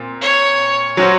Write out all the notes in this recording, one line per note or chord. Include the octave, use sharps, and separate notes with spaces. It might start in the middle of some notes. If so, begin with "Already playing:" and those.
Already playing: A#2 C4
C#5
F#3 C#4 F#4 C5